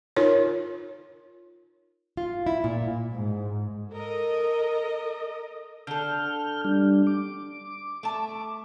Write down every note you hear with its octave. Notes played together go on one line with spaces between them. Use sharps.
D#4 F4 A#4 C#5
F4
E4
A#2
G#2
A4 A#4 D#5
D3 A4 F6 G6
G3 D4
D6
A3 A5